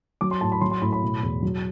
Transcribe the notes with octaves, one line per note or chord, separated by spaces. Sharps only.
F#3 D6
C6
A2 A5
B5
F#3 C6
C6
A2 B5
B5
B2
E2
F#3